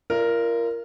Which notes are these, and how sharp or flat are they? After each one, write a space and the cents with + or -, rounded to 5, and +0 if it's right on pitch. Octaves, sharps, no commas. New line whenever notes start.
F4 -40 A#4 +0 D5 +0